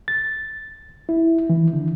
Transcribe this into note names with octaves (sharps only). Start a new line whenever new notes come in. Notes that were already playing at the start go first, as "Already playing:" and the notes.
A6
E4
E3
D3